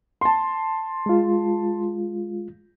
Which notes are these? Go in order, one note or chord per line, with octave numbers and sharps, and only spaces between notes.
A5 C6
G#3 F4